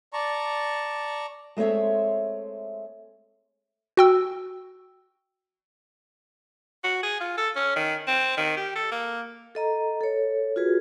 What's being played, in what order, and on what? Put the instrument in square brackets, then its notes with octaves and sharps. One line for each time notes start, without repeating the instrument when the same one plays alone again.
[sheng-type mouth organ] D5 A5 A#5 C#6
[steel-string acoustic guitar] G#3 A3 C4 C#5 E5
[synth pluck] F#4 G5 E6
[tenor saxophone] F#4
G#4
F4
A4
C#4
D#3
C4
D#3
G4
A4
A#3
[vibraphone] A4 D#5 A#5
A4 C#5
F4 F#4 G#4 B4